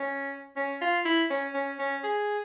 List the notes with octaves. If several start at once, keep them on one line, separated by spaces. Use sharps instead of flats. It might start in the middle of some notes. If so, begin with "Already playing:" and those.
Already playing: C#4
C#4
F4
E4
C#4
C#4
C#4
G#4